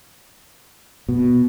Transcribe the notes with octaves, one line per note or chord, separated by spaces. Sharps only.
B2